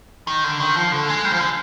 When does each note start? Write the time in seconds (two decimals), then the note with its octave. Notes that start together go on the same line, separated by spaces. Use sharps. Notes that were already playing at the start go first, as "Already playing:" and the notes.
0.27 D#3
0.44 D3
0.60 D#3
0.76 F3
0.92 D3
1.09 G#3
1.25 G3
1.32 F3
1.40 D3